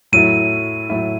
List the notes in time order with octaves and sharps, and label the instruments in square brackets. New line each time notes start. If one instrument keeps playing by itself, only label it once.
[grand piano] A2 F#3 A3 E4 [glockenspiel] D#7
[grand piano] A2 F#3 A3 E4